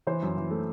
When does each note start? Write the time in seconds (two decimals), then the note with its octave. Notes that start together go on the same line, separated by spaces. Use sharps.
0.07 E3 C5
0.23 F#2
0.37 E3
0.51 A3